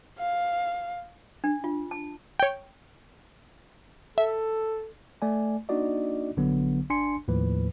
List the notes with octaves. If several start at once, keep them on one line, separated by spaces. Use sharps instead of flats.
F5
D4
F4
A5
C#5 G5
A4 E5
A3 D5 G#5
A#3 D4 D#4 F#4 D5 D#5
A#1 D3 F#3 B3
G#1 D4 G#5 C6 C#7
D#2 A2 F3 B4